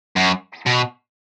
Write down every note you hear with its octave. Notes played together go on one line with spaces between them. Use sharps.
F#2
B2